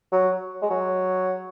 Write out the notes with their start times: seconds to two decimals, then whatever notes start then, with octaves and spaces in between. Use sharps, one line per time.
0.12 F#3
0.62 G#3
0.70 F#3